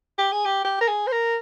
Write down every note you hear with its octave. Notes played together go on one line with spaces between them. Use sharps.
G4
G#4
G4
G4
A#4
G#4
C5
A#4